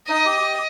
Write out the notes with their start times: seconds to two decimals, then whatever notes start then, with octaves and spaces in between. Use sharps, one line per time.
0.09 D#4 D#5
0.25 G4
0.41 G4